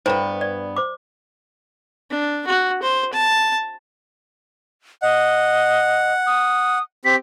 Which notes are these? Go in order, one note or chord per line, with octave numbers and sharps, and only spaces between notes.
G2 B3 C5 A#5
D5
C5 D6
D4
F#4
C5
A5
D#5 F#5
D#6
C4 G4 B6